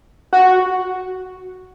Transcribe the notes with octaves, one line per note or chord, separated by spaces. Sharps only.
F#4